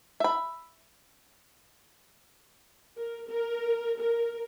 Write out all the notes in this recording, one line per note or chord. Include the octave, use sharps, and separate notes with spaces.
E5 B5
A#4
A#4
A#4